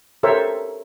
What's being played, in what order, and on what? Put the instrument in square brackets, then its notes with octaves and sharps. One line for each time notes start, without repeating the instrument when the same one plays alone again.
[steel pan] G4 A4 A#4 C5 C#5 E5